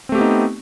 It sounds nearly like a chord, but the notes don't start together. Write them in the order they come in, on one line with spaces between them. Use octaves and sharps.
C4 A3 G4 B3 D#4